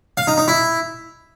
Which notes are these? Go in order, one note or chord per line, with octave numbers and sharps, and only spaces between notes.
F5
D#4
D#4
E4